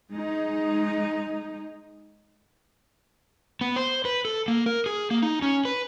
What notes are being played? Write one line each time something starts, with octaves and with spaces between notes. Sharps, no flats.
G#3 D#4
B3
C5
B4
A4
A#3
A#4
G#4
A#3
D#4
C#4
B4